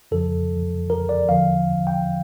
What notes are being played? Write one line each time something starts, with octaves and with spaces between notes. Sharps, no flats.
F2 C#3 F3 A4
A#4
D5
E2 D3 F3 F5
G5